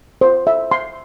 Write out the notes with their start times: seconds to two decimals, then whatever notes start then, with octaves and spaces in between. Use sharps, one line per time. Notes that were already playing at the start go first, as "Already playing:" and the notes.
0.21 C5
0.47 E5
0.71 C6